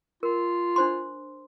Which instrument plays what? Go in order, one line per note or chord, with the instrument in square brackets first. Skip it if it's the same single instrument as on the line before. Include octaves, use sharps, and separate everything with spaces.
[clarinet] F4 [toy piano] A#4
[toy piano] D4 C5 C6